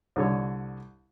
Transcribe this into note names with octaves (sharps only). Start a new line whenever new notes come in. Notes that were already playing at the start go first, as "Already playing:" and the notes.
C2 D3 C#5